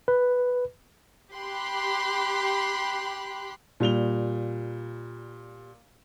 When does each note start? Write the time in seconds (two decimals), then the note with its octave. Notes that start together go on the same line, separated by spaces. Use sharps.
0.08 B4
1.32 G4 B5 C6 F#6
3.80 A#2 G3 F7 G7